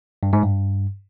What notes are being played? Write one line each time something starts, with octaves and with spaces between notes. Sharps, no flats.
G2
G#2
G2